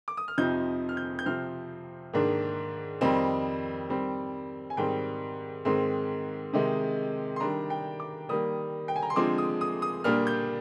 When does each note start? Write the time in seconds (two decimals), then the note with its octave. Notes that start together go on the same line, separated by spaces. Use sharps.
0.08 D6
0.17 D#6
0.28 F6
0.38 F2 C3 F3 C4 D#4 G6
0.89 F6
0.97 G6
1.19 G6
1.25 C3 F3 C4 F6
2.13 G#2 D#3 A#3 D4
3.01 F2 D#3 G3 C4 D#4
3.90 D#3 G3 C4
4.70 G#5
4.77 G#2 D#3 G3 C4 G5
5.65 G#2 D#3 G#3 C4
6.53 C3 D#3 G#3 D#4
7.36 C6
7.40 D#3 G3 D4 A#5
7.70 G5
8.00 D6
8.29 D#3 G3 A#3 D#6
8.88 G5
8.96 G#5
9.03 A#5
9.10 C6
9.16 D3 F3 G#3 C4 D6
9.38 D#6
9.61 D#6
9.82 D#6
10.04 A#2 G3 A#3 D4 F6
10.27 G6